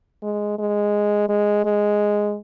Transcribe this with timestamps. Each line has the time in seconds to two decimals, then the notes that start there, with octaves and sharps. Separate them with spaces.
0.23 G#3
0.59 G#3
1.29 G#3
1.65 G#3